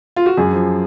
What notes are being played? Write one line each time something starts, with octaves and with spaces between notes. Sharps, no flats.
F4
F#4
F#2 G#4
F3